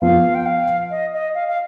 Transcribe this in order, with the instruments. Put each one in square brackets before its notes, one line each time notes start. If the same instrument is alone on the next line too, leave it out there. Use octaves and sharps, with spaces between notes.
[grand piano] F3 B3 F4 [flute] F5
[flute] G5
F5
D#5
D#5
F5
F5